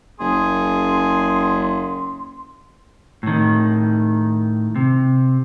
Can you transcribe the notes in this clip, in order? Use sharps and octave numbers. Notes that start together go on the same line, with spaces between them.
F#1 G#4 C6
A2 D#3
C3